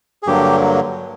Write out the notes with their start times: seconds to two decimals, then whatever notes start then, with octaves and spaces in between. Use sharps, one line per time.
0.23 G#4
0.27 G2 D3 F#3 A#3 G4